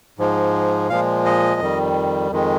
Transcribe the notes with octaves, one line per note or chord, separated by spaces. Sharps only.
G#2 F3 G#3
A#2 F3 G#3 F5
D#5
F2 D#3 G3
F2 D#3 G#3